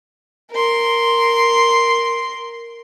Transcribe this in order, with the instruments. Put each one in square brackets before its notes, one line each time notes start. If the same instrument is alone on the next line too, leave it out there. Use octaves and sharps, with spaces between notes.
[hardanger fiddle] A#4 C6